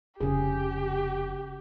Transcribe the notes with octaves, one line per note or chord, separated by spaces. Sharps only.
F1 C#3 G4 G#4